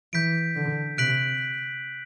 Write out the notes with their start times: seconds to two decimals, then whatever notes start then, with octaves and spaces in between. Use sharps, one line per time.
0.13 E3 G6 B6 D7
0.56 D3
0.98 C3 F#6 B6 D7 F#7